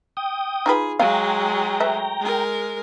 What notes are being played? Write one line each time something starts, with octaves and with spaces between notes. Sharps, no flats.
G5 D#6
D#4 F4 G#4 B4
F#3 G#3 F5 G5 A#5
A3 B4 E5
G#3 A#4